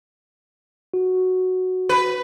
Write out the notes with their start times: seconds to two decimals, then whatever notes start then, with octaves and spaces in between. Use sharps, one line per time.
0.94 F#4
1.89 B4